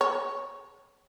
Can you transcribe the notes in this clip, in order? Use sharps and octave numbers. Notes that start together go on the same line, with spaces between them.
C#5